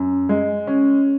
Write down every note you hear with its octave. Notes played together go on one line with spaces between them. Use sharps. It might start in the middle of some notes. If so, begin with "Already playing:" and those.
Already playing: F#2
G#3
C#4